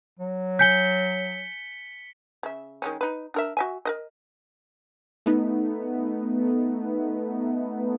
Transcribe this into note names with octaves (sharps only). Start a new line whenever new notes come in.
F#3
G#5 G6 B6 C#7 G7
C#3 E5
D#3 G#3 C#4
D#4 B4
D4 A#4 E5
F#4 E5 G#5
A#4 B4 D#5
A3 B3 D#4